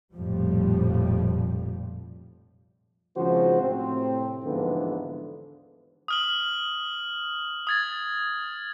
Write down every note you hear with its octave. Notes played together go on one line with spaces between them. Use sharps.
F1 A#1 F2 A2 F3 G3
G#1 C#3 F3 C4 F#4 C5
A2 C3 C4
D#2 G#2 D3 E3 F3 B3
D#6 F6 F#7
D#6 G#6 A6